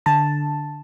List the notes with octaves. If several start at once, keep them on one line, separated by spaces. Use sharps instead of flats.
D3 A5